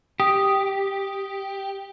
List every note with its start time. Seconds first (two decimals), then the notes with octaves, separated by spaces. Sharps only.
0.20 G4 D#6